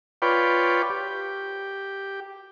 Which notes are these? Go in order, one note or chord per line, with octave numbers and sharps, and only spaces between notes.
F4 B4 C#5 D5 G5
G4